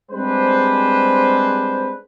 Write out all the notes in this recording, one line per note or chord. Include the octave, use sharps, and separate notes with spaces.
G3 G#3 C4 D4 B4 C5